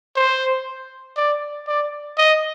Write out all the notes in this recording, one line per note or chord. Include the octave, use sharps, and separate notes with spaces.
C5
D5
D5
D#5